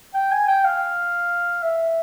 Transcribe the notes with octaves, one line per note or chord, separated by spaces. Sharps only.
G5
G#5
G5
F5
E5